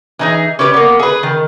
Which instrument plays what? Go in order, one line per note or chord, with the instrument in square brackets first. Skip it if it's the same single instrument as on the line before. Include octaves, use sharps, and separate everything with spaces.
[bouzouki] E3 D#4 G#4
C#4 G4 B4 D5
A#3 B3
G#4 B4
D#3